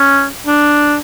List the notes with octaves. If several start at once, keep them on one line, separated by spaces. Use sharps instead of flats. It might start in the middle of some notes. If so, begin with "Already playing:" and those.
Already playing: C#4
D4